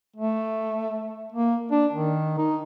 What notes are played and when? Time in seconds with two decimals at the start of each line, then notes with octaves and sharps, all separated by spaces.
0.16 A3
1.32 A#3
1.71 D4
1.93 D#3
2.38 D#4